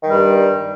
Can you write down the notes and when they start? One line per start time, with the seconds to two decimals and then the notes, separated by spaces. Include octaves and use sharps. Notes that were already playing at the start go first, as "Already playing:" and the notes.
0.02 D#3
0.07 G3
0.11 G2